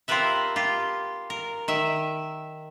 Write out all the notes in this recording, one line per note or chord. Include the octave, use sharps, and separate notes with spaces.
C4 F4 G4 A#4 B4 E5
F4 G4
A#4
D#3 E5